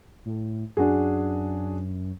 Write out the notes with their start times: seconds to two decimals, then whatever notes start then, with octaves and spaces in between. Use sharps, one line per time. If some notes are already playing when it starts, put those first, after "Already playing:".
0.25 A2
0.77 F#2 D4 F#4 G#4